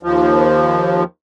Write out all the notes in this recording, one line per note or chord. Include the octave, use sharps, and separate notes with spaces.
D#2 F3